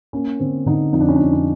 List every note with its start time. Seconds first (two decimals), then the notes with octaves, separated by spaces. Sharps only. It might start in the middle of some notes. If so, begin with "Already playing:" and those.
0.13 A#3 C#4
0.40 D3 C4
0.66 D3 D#4
0.93 F2 D#4
1.00 D4
1.08 C#4
1.16 F2 D4
1.33 C#4